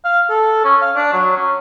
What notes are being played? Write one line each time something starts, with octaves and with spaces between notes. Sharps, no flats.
F5
A4
C#4
F5
D4
F#3
C#4